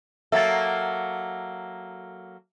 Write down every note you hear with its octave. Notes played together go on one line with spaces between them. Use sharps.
F#3 A#3 A4 E5 A6